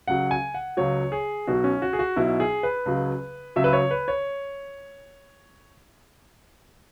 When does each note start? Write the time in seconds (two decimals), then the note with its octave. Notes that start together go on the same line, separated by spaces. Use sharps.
0.08 C#2 C#3 F#3 F#5
0.31 G#5
0.54 F#5
0.77 C#2 C#3 F#3 C#5
1.12 G#4
1.47 B1 B2 F#3 F#4
1.64 C#4
1.82 F#4
1.93 G#4
1.99 F#4
2.16 B1 B2 F#3 E4
2.40 G#4
2.63 B4
2.86 C#2 C#3 F#3
3.56 C#2 C#3 F#3 E5
3.64 B4
3.73 C#5
3.91 B4
4.08 C#5